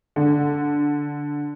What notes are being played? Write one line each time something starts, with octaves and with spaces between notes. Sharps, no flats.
D3